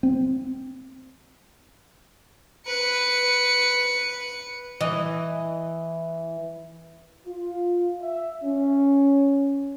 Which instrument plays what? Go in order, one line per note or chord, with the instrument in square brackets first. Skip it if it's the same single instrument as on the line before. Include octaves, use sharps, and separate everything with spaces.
[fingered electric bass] C4
[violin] B4 C#7
[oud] E3 D#5
[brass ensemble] F4
E5
C#4